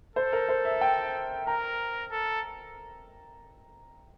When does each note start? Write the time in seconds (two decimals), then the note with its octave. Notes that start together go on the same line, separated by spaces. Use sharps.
0.16 A4 C5
0.33 A#4
0.49 C5
0.65 E5
0.81 G5
1.47 A#4 A#5
2.11 A4